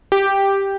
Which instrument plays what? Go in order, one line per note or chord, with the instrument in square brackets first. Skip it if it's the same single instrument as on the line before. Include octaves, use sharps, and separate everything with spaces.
[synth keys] G4